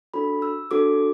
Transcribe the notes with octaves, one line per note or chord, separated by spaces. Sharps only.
D4 F#4 A4 B5
E6
D4 F#4 A4 D6